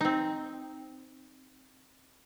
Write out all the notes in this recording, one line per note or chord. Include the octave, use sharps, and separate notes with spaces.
C4 D#4